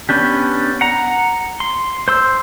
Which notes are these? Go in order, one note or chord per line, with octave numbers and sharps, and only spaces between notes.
B3 C#4 D4 G4
F#5 A#5
C6
C5 C6 E6